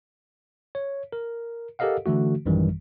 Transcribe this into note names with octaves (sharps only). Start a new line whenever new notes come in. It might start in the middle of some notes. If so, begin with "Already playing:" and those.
C#5
A#4
G4 A4 A#4 D#5 F5 F#5
D3 E3 A3 F#4
A1 F#2 D#3 E3 G3